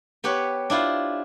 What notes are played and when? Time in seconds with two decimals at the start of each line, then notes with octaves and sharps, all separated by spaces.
0.24 B3 G4 B4 C#5
0.70 D4 E4 F4 C5